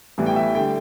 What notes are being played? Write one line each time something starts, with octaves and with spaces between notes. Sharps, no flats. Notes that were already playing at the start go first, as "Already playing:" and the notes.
A1 A2 E3 G3 B3
G5
E5
D3 G3 G5